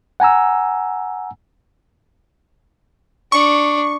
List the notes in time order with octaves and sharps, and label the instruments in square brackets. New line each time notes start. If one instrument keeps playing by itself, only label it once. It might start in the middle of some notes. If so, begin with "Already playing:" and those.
[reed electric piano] F#5 G#5 A#5 E6
[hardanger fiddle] D4 [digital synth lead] C#6